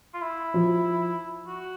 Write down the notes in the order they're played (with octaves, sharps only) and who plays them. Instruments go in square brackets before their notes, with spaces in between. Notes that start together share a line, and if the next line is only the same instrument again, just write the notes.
[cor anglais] F4
E4
[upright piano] F3
[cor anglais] F#4